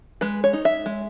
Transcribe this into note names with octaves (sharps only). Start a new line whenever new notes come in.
G#3 B4
C#5
D#4
E5
G#3